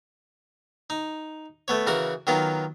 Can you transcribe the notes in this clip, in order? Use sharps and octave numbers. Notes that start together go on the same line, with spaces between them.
D#4
A3 B3 C#5
C#3 E3 F#4 A#4
D#3 F#3 B3 F4